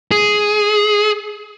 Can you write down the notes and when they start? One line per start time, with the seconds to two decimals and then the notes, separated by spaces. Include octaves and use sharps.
0.11 G#4